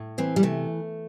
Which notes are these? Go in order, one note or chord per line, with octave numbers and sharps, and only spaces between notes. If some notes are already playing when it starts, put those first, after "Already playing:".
Already playing: A2
E3 C4
G3
C3 A3